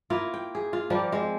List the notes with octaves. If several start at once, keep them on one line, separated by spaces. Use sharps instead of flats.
A#3 E4 F4
G5
G#4
F4
F3 G3 A#3 G4
G#3 C4